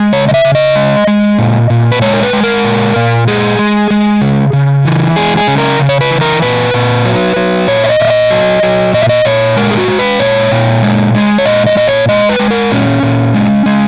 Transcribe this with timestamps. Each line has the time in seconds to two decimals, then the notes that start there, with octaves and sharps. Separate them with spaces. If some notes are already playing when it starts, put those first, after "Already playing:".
Already playing: G#3
0.13 C#3 C#5
0.29 D#5
0.34 E5
0.45 C#3
0.55 D#5
0.76 G#3
1.07 G#3
1.39 A#2
1.70 A#2
1.92 B4
2.02 G#3 C#5
2.13 A#4
2.23 B4
2.33 G#3
2.43 A#4
2.64 A#2
2.96 A#2
3.27 G#3 G#4
3.59 G#3
3.91 G#3
4.21 C#3
4.53 C#3
4.85 E3
5.16 G#3 G#4
5.37 G#4
5.48 C#3
5.58 A#4
5.79 C#3
5.89 C#5
6.01 B4
6.11 E3
6.21 A#4
6.42 A#2 B4
6.74 A#2
7.05 F#3
7.36 F#3
7.68 A#2 C#5
7.84 E5
7.89 D#5
8.00 A#2 E5
8.10 D#5
8.31 F#3
8.63 F#3
8.93 A#2 D#5
9.02 E5
9.09 D#5
9.25 A#2 C#5
9.57 G#3 A#4
9.71 G#4
9.78 F#4
9.88 G#3
9.99 B4
10.19 A#2 C#5
10.52 A#2
10.82 G#3
11.14 G#3
11.38 C#5
11.45 A#2 D#5
11.67 D#5
11.77 A#2 D#5
11.88 C#5
12.09 G#3 D#5
12.29 B4
12.39 G#3
12.51 A#4
12.71 A#2 C#4
13.03 A#2
13.34 G#3
13.66 G#3